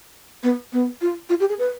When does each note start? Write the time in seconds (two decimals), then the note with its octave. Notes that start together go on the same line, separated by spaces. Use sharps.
0.43 B3
0.73 B3
1.01 F4
1.29 F4
1.40 G4
1.49 G#4
1.59 B4